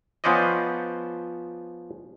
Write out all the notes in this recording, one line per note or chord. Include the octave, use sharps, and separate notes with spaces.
F3 B3 C#4 C5 D5 D#5